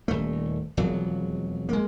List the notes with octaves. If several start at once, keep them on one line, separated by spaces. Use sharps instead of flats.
D#1 A3
E1 F2 F#3
G#3 A#3